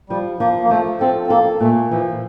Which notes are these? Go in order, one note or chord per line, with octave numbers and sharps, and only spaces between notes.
F3 G3
F3 A#3
A#3
F3 A3
C4 A4
C4
A#3 A4
A#2 A3
E3 F3